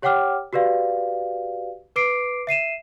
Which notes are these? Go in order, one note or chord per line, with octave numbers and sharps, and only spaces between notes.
G4 C#5 F#5 G5 D6 F6
F#4 G4 B4 D5 F5
B4 D6 C7 D7
E5 C7 D#7 E7